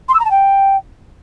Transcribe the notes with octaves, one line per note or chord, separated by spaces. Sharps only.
C6
E6
A#5
A5
G5